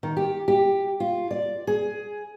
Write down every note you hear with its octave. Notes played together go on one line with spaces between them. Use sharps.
D#3
G4
G4
F4
D5
G#4